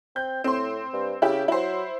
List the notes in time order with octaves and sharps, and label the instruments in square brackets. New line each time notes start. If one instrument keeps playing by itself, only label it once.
[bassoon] C4 [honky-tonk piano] G6
[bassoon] A2 [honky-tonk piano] C4 C6
[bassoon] G2
[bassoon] C#3 [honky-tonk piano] E4 G4
[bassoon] F#3 [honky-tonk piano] E4 C5